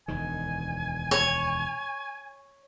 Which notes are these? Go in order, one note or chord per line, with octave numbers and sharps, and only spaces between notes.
E1 D2 D#3 G#5
C#5